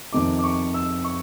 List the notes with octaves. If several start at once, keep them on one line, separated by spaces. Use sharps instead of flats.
F2 C3 D#3 D6
D6
C#6
E6
C#6